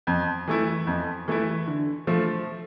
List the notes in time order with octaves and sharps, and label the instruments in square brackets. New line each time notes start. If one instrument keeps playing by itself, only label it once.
[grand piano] F2
E3 A3 E4
F2
E3 A3 E4
D3
F3 A3